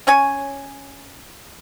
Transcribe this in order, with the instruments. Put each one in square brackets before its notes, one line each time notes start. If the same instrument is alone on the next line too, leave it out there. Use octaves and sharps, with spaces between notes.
[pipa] C#4 C#5 G#5